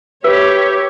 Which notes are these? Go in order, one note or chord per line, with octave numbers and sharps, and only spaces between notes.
G4 B4 C#5 E5